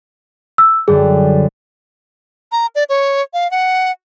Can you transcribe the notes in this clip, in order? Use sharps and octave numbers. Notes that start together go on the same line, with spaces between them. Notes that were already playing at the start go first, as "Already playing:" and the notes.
E6
F#2 D3 G3 G#4
A#5
D5
C#5
F5
F#5